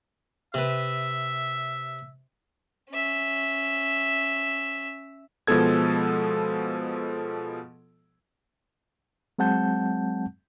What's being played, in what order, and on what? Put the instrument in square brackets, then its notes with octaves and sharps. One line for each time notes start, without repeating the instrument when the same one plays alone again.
[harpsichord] C3 B4 [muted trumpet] E5
[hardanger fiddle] C#4 E5
[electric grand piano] B2 F3 G#3 B3 A4 G#6
[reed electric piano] F#3 G#3 C4 F#5 A5 G6